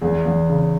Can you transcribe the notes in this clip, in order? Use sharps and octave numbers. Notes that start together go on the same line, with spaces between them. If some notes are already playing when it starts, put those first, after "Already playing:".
E2 G#4
E2
C#3